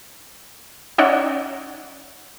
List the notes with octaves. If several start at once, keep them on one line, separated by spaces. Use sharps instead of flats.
C#4 D#4 C#5 D5 E5 F#5